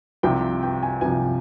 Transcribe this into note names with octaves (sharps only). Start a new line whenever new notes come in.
C2 C3 F3 G5
G5
G#5
C2 C3 F3 G#5